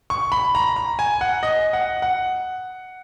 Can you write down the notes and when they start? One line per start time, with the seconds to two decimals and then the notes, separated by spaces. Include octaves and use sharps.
0.10 C#6
0.32 B5
0.55 A#5
0.76 A#5
0.99 G#5
1.21 F#5
1.43 D#5
1.73 F#5
2.02 F#5